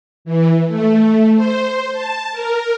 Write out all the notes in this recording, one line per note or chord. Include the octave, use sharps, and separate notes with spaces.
E3
A3
C5
A5
A#4